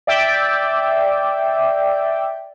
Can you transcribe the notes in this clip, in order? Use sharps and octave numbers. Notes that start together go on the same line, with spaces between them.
D5 E5 G5